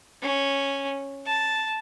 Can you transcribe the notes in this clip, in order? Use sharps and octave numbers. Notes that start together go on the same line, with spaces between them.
C#4
A5